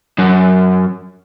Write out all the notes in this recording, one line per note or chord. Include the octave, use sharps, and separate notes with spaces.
F#2